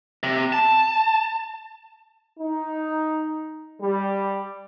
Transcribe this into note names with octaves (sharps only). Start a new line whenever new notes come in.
C3
A5
D#4
G3